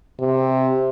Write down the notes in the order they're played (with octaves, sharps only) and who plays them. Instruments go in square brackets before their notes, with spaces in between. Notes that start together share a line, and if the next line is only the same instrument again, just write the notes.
[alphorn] C3